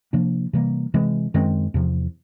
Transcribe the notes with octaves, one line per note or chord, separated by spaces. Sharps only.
C3 F3 A#3 D4
C3 E3 G3 A#3
C3 E3 G#3 C4
F#2 D#3 G#3 C4
E2 C3 F3